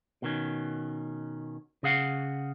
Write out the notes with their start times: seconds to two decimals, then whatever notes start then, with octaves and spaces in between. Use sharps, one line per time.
0.22 B2 D#3 C#4
1.83 C#3 G#4 F5 F#5